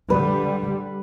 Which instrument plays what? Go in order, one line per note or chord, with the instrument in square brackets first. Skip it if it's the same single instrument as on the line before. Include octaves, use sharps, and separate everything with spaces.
[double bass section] D3 G3 [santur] B4